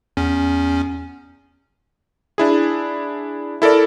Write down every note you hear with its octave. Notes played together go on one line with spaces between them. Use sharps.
E2 C#4
D4 E4 G#4
E4 A4 A#4 D5